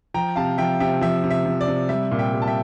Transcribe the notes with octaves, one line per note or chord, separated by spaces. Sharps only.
F3 G5 A#5
C3 F5 A5
F3 E5 G5
C3 E5 G5
F3 E5
C3
E5
F3
D5
C3
G3 E5
A#2
E5 G5
G3
A5
E5 G5